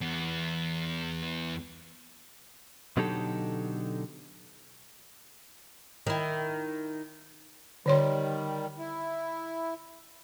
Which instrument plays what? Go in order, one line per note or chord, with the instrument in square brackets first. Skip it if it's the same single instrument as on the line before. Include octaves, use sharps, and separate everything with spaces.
[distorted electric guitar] E2 B3
[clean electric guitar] B2 D3 F#3 D#4 G4 A4
[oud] D#3 E4
[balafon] D3 C#5 C6 [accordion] D#3 G3
[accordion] E4